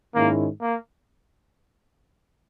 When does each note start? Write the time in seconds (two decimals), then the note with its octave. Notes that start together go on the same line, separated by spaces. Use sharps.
0.15 G#2 D#3 G#3 A#3 C#4 E4
0.61 A#3